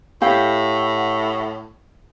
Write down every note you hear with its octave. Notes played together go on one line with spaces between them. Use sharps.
A2 G4 F5 F#5